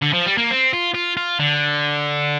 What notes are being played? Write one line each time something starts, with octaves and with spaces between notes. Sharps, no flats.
D3
F3
G3
A#3
C4
F4
F4
F4
D3